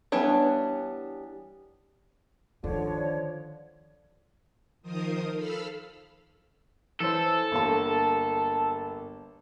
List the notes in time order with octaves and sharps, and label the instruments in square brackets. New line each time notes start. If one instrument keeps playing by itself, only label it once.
[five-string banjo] E3 G3 B3 D4 C#5
[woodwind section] D3 [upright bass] D#3 [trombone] F3 [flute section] C#5
[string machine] D#3 F3 A#4 C5 D#6
A4 F5 B5 E6 F6
[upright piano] E3 C5 [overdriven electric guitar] A4
[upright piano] G1 A#3 A5